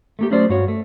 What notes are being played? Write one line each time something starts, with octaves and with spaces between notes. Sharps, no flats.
A3 A#3 G4
F#3 A3 C#4 G#4 C5 D5
G2 F#4 C#5
A3